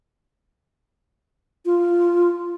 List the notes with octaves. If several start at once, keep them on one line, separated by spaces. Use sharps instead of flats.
F4